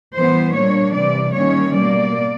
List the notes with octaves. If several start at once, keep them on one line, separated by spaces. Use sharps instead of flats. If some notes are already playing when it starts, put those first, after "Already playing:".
E3 G3 B3 C5
A#2 G3 A#3 D4 C#5
C3 E3 G3 D5
D#3 G3 A#3 C#4 C#5
B2 G3 A#3 D5